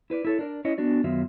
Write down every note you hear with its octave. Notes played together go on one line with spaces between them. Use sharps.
E4 B4 C5 D5
E4 A4 C#5
D4 A#4 D5
C#4 E4 C#5 D#5
B3 D4 F#4 D5
F#2 D#3 F#3 B3 F4 E5